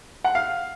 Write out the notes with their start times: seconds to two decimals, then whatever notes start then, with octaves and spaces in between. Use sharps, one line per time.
0.24 F#5
0.35 F5